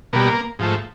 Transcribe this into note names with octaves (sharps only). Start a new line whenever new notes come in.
B2 G3 A#3
G#2 F3 A3